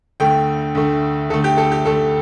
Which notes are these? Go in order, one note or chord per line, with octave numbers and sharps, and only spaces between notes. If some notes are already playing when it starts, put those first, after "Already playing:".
D2 D3 A3 G5
D2 D3 A3
D2 D3 A3 A4
G4
A4
G4
D2 D3 A3 A4